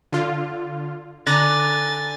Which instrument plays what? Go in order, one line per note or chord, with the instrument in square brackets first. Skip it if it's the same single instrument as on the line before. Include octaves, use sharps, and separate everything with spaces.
[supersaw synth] D3 F4
[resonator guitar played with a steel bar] D3 [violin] G#5 A6 [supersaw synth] A#5 F#6 A#6